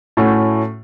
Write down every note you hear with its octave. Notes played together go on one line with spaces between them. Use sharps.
A2 A3 C#4 F#4